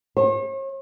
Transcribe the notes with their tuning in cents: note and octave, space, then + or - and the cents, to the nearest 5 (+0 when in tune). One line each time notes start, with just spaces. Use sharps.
C#5 -45